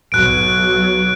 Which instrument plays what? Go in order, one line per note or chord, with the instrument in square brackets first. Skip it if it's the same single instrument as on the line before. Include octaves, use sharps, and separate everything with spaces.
[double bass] B1 F#3 [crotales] F#6 D7